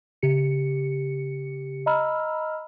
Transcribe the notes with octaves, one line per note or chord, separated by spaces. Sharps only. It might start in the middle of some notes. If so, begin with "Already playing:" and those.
C#3 G4 C#7
D#5 A#5 B5 E6 F6